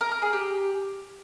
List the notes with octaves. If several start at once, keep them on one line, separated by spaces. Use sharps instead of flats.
A#4
A#4
G#4
G4